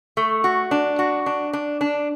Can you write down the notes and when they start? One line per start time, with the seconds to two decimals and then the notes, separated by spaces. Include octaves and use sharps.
0.17 A3
0.44 F#4
0.71 D4
0.99 F#4
1.26 D4
1.53 D4
1.81 D4